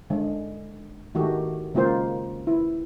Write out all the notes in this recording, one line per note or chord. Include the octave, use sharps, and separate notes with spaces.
D3 G#3
D#3 A3 F#4 G4
C#3 G#3 A#3 F4 C5
E4